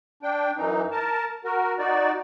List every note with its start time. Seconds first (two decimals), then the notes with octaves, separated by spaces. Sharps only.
0.23 D4 G5
0.57 F#2 E3 D#4
0.91 A#4 A5
1.44 F#4 A#4
1.79 D#4 F#4 D5